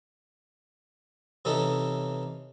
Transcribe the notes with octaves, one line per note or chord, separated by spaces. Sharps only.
C3 E3 C#4 D#4 A4